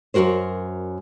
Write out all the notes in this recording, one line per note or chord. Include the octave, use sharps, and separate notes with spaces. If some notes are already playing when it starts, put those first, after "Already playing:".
F#2 B2 F#4 A#4 C5